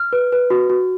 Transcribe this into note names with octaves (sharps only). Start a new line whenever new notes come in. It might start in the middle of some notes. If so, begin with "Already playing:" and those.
Already playing: F6
B4
B4
F#4
F#4